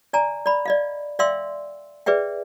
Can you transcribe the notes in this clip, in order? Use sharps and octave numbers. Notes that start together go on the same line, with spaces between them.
D5 G#5 A#5
D5 B5
D5 D#5 F5
D5 E5 F5 G5 C6 E6
G#4 B4 D5 E5 G5